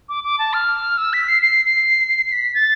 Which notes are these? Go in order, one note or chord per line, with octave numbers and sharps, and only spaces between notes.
D6
D6
A5
F6
E6
B6
C7
C7
C7
B6
A6